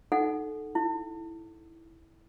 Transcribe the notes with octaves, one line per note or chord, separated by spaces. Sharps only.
D#4 A4 F#5
E4